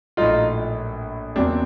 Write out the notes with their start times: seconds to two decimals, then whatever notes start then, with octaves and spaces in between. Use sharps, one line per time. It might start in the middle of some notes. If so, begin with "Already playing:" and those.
0.17 A#1 A2 F#3 A3 D#4 F4
1.36 E2 C#3 F#3 A#3 C4 D4